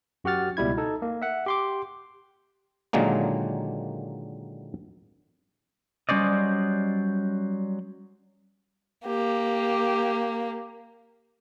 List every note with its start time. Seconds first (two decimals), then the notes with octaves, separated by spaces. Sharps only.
0.24 F#2 F#4 G4 F#5 F6 A6
0.57 C#2 B2 G3 E4 G#6
0.77 D#4 A4
1.02 A#3
1.22 E5 F#5
1.46 G4 C6 D6
2.93 A#2 D3 D#3 F#3 G#3 A#3
6.09 F#3 G3 C#4 C5 D5 D#5
9.06 A#3 G4